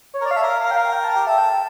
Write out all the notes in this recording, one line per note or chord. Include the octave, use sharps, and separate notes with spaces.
C#5
A#4
C#5 D5
F5
A4 E5
A#4
F5
A#4 F5
G5
F5
G5
A5
G4 G5
A4 E5
G5
A5